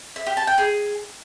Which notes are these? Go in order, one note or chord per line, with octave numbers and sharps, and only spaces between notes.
E5
G4
A5
G5
G#4